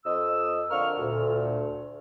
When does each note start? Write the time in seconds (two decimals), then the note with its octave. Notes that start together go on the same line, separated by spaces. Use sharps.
0.05 F2 D#5 E6
0.70 D3 F3 A#4 F5 C#6 F6
0.98 D2 A#2